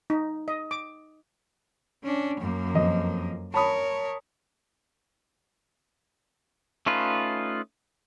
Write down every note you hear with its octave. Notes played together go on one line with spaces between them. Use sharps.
D#4
D#5
D6
C#4 D4
F#2 A#3
F2 D#5
A#4 C#5 A5 B5 D#6
A3 C#4 D#4 F4 B4